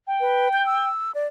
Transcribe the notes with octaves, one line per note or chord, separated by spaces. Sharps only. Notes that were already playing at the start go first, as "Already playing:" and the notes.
G5
B4
G6
E6
D5